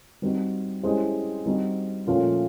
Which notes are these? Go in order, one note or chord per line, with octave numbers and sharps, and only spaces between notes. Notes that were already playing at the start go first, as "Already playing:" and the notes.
G3 C4 D#4 F#4
G#3 C#4 E4 G4 C5
G3 C4 D#4 F#4
A#2 F3 A3 C#4 F4